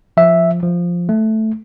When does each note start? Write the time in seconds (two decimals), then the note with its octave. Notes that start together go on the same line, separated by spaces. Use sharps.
0.17 F3 E5
0.63 F3
1.09 A3